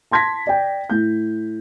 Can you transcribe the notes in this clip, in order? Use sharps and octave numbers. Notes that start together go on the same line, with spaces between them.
A5 C6 G#6 A#6 B6
D5 G5
A2 G6